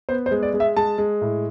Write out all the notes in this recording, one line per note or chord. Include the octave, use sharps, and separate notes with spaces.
B3 C5
C5
G#3
D5
G#3
E5
G#3 A5
G#3
A2